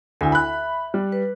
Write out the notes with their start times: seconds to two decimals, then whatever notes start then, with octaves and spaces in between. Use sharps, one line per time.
0.21 D2 E4 G#5
0.32 E5 B5 F#6
0.94 G3
1.12 B4